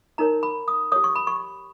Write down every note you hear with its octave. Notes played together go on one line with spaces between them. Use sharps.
D#4 A#4 C#5 A#5
B5
D#6
G4 C#5 D#6
C#6
B5
C#6